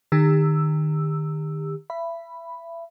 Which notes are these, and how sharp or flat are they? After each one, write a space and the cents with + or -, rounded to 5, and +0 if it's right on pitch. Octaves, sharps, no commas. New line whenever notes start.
D#3 -25 G4 +35 E6 +0
E5 +30 B5 +0